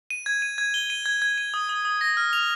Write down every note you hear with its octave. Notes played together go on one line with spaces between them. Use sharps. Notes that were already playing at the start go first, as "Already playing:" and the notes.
D#7
G#6
D#7
G#6
G7
D#7
G#6
G#6
D#7
D#6
D#6
D#6
A#6
F6
F7